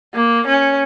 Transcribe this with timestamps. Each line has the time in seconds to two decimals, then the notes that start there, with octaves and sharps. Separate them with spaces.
0.14 A#3
0.47 C#4